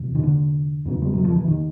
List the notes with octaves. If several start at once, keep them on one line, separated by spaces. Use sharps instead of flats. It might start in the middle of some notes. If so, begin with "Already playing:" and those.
Already playing: E2 C3
D#3
D3
E2 C#3
G3
F#3
F3
E3
D#3